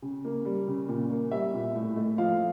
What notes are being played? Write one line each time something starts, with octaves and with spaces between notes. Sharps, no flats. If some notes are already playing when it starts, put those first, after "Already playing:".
C#3
A#3
G3
C#3
A#2
A#3
G3 E5
A#2
A2
A3
F3 F5